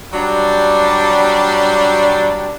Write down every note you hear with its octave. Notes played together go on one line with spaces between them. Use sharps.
F#3 G3 D4